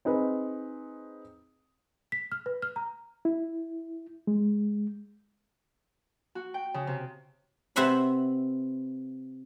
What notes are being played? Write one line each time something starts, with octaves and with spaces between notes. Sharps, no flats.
C4 D#4 G#4 B4
B6
F6
B4
F6
A#5
E4
G#3
F#4
G5
C#3
C3
C3 C4 B4 E5 F#5 B5